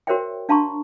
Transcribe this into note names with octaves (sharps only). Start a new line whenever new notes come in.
F#4 A#4 C5 C#5 E5 G5
D4 F5 A5 A#5 C6 C#6